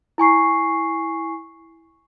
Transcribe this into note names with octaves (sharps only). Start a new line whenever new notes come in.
E4 G#5 C#6 C7